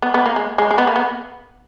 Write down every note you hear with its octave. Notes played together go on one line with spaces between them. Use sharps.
B3
B3
A#3
G#3
G#3
G#3
B3
A#3
B3